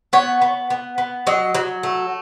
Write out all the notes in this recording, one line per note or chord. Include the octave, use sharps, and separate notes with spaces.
B3 C#5
B3
B3
B3
F#3 D#5
F#3
A3